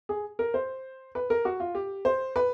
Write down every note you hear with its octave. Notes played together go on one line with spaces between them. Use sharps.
G#4
A#4
C5
B4
A#4
F#4
F4
G4
C5
B4